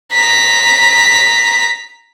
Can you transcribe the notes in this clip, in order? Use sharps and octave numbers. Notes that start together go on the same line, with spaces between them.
A#5 B6